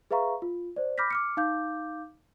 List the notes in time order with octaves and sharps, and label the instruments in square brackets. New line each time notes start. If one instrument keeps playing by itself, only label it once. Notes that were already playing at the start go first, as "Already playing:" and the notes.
[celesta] G#4 B4 E5 F5 A#5 C#6
F4
C5 D5
B5 D6 F6 G6 A#6 B6
D6 F6 C#7
D#4 F5 D6 G6